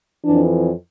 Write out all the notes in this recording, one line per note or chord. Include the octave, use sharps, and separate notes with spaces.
F2 E3 D4